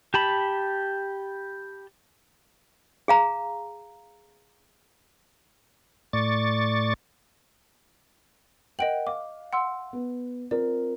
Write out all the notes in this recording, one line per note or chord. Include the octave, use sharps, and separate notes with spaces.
G4 A5 B5
G#4 F5 A#5
A2 D5 C#6 A6
A#4 D#5 F#5 G5 D7 F#7
F5 D6
F#5 C6 E6
B3
C4 F4 A#4 D5